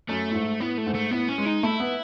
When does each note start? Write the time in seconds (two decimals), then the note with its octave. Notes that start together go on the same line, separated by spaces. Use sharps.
0.09 F#2 A3
0.30 A2
0.35 G#2
0.60 A2 B3
0.78 A3
0.87 G#2
0.95 A3
1.11 A2 B3
1.29 C#4
1.38 G#3
1.46 D#4
1.63 A3 E4
1.80 B3